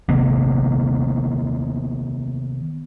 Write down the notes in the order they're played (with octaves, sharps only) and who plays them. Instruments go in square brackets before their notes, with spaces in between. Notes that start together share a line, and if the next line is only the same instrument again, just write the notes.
[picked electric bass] C3 D#3 A#3 B3